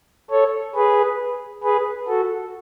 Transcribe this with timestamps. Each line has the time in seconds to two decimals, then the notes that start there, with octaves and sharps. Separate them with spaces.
0.31 A4 C#5
0.75 G#4 B4
1.64 G#4 B4
2.08 F#4 A4